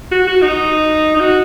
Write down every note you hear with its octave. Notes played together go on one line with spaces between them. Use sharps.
F#4
F#4
D#4
D#4
F#4